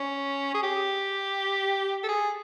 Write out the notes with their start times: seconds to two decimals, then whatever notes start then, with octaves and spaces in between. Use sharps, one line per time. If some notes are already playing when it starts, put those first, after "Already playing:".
Already playing: C#4
0.54 G#4
0.63 G4
2.04 A4
2.09 G#4